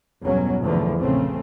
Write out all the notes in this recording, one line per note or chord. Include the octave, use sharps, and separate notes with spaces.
G1 E2 B2 F#3 C#4
B1 E2 D3 E3 F3 A3
A#1 C#3 A3 C4